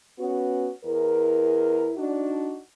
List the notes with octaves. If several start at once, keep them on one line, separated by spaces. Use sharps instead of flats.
B3 C#4 F#4
E2 E4 G#4 A#4
D4 D#4 F#4